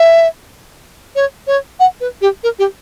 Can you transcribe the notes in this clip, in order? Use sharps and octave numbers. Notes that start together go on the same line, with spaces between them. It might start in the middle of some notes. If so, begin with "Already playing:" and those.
Already playing: E5
C#5
C#5
F#5
B4
G4
A#4
G4